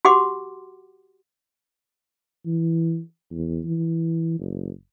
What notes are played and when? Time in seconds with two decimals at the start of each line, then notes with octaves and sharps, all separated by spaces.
0.05 F#4 G4 F#5 C6 D6
2.46 E3
3.30 E2
3.65 E3
4.39 F#1